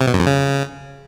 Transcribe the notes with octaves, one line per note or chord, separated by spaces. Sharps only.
C3
B2
F#2
F2
C#3